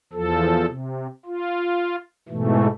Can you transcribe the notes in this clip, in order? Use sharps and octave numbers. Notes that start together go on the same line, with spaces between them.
E2 F3 A4
C3
F4
G#2 B2 E3 A3